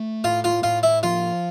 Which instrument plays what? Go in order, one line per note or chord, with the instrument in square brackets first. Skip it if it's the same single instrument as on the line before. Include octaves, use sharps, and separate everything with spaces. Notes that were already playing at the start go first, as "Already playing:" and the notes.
Already playing: [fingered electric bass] A3
[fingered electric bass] A2 [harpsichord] F4
[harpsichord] F4
[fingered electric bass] A2 [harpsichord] F4
[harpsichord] E4
[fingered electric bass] F3 [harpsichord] F4